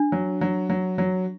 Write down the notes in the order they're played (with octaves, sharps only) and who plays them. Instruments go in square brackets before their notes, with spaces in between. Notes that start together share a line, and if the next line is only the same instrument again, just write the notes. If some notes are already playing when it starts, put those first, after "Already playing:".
Already playing: [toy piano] D4
[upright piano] F#3
F#3
F#3
F#3